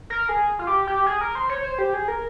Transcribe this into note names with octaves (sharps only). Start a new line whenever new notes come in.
A#4
G#4
F4
G4
G4
G#4
A#4
C5
C#5
C5
G4
G#4
A#4